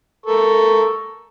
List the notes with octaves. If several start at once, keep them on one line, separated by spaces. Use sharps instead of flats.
A4 A#4 C#6